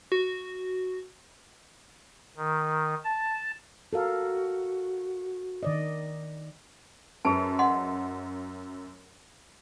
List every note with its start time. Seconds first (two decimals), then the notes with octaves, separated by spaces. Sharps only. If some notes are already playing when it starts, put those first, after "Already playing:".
0.12 F#4
2.37 D#3
3.04 A5
3.93 F#4 A4 A#4 F5
5.63 D#3 D5 D#5
7.25 F#2 G#4 B4 A5
7.59 D#5 F#5 C6